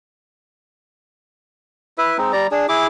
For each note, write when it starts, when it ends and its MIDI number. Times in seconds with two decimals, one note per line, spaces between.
1.98 2.18 64
1.98 2.18 71
1.98 2.18 76
2.18 2.32 56
2.18 2.32 60
2.18 2.32 63
2.33 2.47 55
2.33 2.47 74
2.33 2.47 82
2.51 2.66 62
2.51 2.66 68
2.69 2.87 64
2.69 2.87 68
2.69 2.87 86